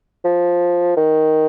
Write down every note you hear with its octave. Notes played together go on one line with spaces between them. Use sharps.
F3
D#3